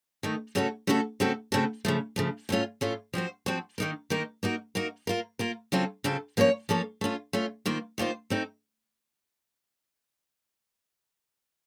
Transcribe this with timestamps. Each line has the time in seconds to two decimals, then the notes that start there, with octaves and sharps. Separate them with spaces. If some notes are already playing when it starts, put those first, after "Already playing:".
0.23 D#3 A3 D#4
0.55 C#3 A3 C#4 F#4 A4
0.87 C#3 A3 C#4 F#4 A4
1.20 C#3 A3 C4 F#4 A4
1.52 C#3 A3 C4 F#4 A4
1.85 C#3 F3 A3
2.16 C#3 F3 A3
2.49 A2 A3 C#4 F4
2.81 A2 A3 C#4 F4
3.13 F3 C4 F#4 C5
3.46 F3 C4 F#4 C5
3.78 D#3 A#3 D#4 A#4
4.10 D#3 A#3 D#4 A#4
4.43 A#3 D#4 F#4 A#4
4.75 A#3 D#4 F#4 A#4
5.07 A#3 F4 A#4
5.39 A#3 F4 A#4
5.72 C#3 F#3 C4 F4 A4
6.04 C#3 F#3 C4 F4 A4
6.37 F3 A#3 C#4 A4 C#5
6.69 F3 A#3 C#4 A4 C#5
7.01 A3 C#4 F4
7.33 A3 C#4 F4
7.66 D#3 A#3 F4 C5
7.98 D#3 A#3 F4 C5
8.30 A3 C4 D#4